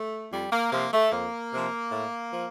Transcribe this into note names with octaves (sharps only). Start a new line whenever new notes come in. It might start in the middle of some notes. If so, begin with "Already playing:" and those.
Already playing: A3
F2 G3
A#3
C3 F3 A#3
A3
F2 A#3
C3 F3
A2
F3